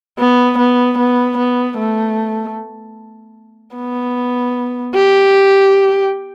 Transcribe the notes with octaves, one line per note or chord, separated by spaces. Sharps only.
B3
B3
B3
B3
A3
B3
G4